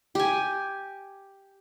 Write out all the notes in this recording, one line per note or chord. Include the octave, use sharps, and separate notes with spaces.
G4 G#5